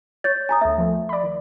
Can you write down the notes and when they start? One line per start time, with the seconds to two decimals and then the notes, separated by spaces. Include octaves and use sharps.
0.24 C#5 G6 A6
0.49 G#5 A#5 D#6
0.61 D2 A3 E5
0.78 F3 A3
1.09 D5 B5
1.23 D#3